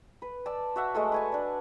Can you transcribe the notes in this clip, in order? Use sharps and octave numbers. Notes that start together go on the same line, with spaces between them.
B4
D5 A5 E6
F#4 E5 F#5
G#3 A3 A4
B4 G#5 A5
D4 D5